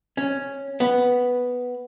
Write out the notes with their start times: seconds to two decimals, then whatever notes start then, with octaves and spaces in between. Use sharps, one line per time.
0.17 C#4
0.80 B3